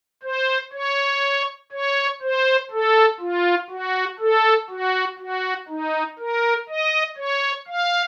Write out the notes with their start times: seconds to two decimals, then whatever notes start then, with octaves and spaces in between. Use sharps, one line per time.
0.23 C5
0.73 C#5
1.72 C#5
2.22 C5
2.71 A4
3.20 F4
3.70 F#4
4.19 A4
4.70 F#4
5.19 F#4
5.69 D#4
6.19 A#4
6.68 D#5
7.17 C#5
7.67 F5